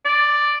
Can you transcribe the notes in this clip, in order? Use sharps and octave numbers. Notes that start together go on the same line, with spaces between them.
D5